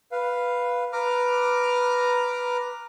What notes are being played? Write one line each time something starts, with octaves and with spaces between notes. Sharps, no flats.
B4 F5
B4 A#5 D6 F6